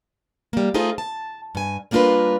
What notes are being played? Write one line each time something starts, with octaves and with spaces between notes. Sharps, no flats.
G3 A#3
A3 D#4 F4 G#4 A4 C5
A5
G2 G#5
G3 A#3 D4 F4 A#4 B4